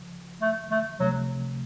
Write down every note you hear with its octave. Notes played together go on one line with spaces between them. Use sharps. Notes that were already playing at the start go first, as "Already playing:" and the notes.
Already playing: C#2 C#3 F3
A3
A3
C#2 C3 F3 F#3 A3